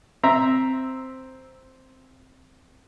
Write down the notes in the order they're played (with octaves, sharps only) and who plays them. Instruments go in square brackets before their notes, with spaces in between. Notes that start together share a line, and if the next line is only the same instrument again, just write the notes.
[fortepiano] C4 E5 A#5